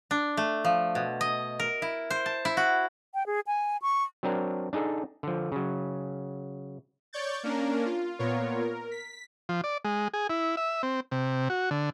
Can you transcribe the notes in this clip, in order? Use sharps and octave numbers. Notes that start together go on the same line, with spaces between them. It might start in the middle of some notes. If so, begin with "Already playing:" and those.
D4
A3
F3
B2
D#5
A#4
E4
C5
A5
E4
F#4
G5
G#4
G#5
C#6
F#3 C4 D4 A#4
D4 D#4 G#4 A4
D3 F3
C#3 F#3
C#5 D5 C#6 G6 A6
A#3 C#4 D4 A#4
F4
A#2 B3 F4 A#4 C#5
A#4
B6
F3
D5
G#3
G#4
E4
E5
C4
C3
F#4
D3